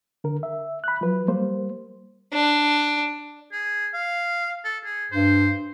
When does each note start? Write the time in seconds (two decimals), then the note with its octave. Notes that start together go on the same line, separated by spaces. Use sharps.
0.24 D3 A#4
0.43 E5
0.84 B5 F#6
1.01 F3 F#3 B4
1.28 G3 A#3 C5
2.33 D4
3.52 G#4
3.94 F5
4.64 A4
4.85 G#4
5.12 G2 C5